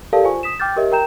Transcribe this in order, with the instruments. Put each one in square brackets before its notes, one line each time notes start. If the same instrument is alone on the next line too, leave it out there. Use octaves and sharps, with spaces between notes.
[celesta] G4 A4 A#4 D5 F5 A5
F4 C5 G#5 C#6
D#6 B6 E7
G5 D6 F6 G6 A6
G4 A#4 C#5 D#5 E5
A#4 G5 A#5 G6 E7